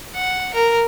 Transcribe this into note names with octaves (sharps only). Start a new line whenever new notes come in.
F#5
A#4